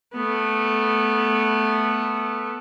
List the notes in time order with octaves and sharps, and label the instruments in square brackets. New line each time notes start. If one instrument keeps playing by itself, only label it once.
[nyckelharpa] A3 B3